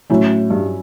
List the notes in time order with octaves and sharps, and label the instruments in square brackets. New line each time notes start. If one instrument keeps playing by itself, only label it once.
[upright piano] A2 [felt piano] F#3 C#4 E4
[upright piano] G2